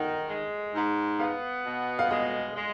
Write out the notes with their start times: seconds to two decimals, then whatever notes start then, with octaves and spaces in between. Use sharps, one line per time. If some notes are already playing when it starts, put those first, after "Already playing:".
Already playing: D#3 F#5
0.28 G#3
0.74 G#2
1.19 B3 F5
1.66 B2
1.99 F5
2.10 G#3 D#5
2.56 G#3